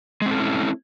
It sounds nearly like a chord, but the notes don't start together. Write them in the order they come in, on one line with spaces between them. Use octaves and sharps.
G#3 C4 A4 C#4 E4